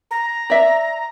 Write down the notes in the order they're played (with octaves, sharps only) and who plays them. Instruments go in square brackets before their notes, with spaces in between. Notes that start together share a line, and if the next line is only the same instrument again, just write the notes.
[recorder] A#5
[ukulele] D5 E5